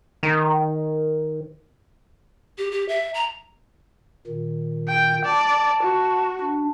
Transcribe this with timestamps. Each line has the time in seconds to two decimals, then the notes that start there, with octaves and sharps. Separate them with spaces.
0.23 D#3
2.58 G4
2.71 G4
2.89 E5
3.14 A#5
4.27 A#2 D#3
4.88 G5
5.25 D5 A5
5.83 F#4
6.40 D4